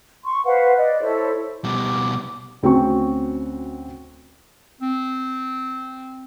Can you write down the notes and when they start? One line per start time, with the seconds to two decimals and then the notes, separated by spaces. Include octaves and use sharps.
0.24 C6 C#6
0.45 B4 C5 F5 F#5
0.76 D5 D#5
1.01 E4 A4 C5 C#5
1.64 B2 G3 D6
2.63 D2 C4 C#4 F#4 G5 C#6
4.81 C4